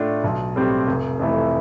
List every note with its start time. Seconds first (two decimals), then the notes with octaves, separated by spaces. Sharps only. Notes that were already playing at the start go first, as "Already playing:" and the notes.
Already playing: A2 A3 D4 F4
0.24 B1
0.56 A2 G3 C4 G4
0.88 F1
1.19 F2 E3 A3 E4